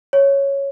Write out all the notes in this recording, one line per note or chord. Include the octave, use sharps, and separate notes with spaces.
C#5